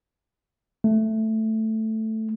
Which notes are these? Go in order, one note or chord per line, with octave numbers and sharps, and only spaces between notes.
A3